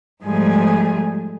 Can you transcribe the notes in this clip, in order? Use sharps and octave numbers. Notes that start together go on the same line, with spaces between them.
G#2 F3 G3 A3 G#4 G#5